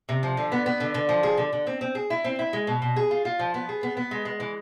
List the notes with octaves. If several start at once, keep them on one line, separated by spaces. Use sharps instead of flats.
C3
F3
D3
B3
B3
D3
D3
F3
G#4
D3
D3
C4
C4
G#4
E4
C4
E4
G#3
B2
B2
G#4
F4
F4
F3
B3
G#4
B3
B3
G#3
G#3
E3